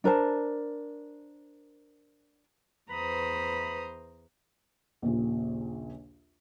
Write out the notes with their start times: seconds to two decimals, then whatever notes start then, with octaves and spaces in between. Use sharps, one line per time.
0.04 D4 A#4 C5 A5
2.90 E2 B4 C5 A#5 B5 D#6
5.02 A#1 D#2 A#2 C#3